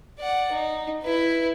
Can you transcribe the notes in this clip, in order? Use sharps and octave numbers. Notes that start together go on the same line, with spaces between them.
D5 F#5
D#4
E4 B4